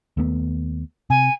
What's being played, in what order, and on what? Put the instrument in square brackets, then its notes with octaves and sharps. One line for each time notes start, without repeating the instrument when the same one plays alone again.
[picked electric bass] D#2 A3 B3
[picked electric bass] C3 [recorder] G#5